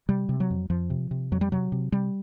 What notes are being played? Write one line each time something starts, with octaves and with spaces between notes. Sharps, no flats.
C3 G3
C3
F#3
F2
F2 F3
C3
C3
F2 F#3
G3
C3 F#3
C3
C3 G3